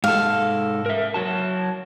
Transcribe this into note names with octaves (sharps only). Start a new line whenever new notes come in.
G#2 A4 F5
A#4 E5
F#3 F#4 A5